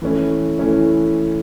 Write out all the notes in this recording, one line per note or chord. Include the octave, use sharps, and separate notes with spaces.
E3 A3 C#4 E4
E3 A3 C#4 E4